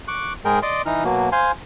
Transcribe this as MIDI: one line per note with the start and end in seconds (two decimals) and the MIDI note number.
0.08 0.33 85
0.08 0.33 86
0.08 0.33 90
0.45 0.59 44
0.45 0.59 56
0.45 0.59 68
0.45 0.59 70
0.45 0.59 79
0.63 0.82 74
0.63 0.82 75
0.63 0.82 84
0.63 0.82 86
0.86 1.04 52
0.86 1.04 63
0.86 1.04 89
1.04 1.29 47
1.04 1.29 54
1.04 1.29 58
1.32 1.51 72
1.32 1.51 77
1.32 1.51 80
1.32 1.51 84